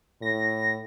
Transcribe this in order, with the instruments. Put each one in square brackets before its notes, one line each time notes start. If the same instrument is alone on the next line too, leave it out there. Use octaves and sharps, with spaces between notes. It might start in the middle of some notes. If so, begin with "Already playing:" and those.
[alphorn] A2 [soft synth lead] A#6